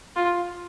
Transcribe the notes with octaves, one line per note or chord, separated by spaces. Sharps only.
F4